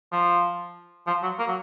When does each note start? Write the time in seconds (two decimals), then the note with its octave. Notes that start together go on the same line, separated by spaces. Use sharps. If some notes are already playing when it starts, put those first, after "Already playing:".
0.12 F3
1.07 F3
1.23 F#3
1.39 A#3
1.47 F#3